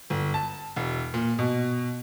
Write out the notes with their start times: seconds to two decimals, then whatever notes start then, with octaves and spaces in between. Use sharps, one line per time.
0.10 G1
0.34 A5
0.76 E1
1.14 A#2
1.39 B2